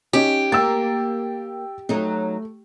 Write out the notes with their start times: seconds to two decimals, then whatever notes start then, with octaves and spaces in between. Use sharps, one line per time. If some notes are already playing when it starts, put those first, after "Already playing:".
0.13 C#4 D#4 G4
0.52 A#3 G5 E6 A6
1.89 F#3 A3 D#4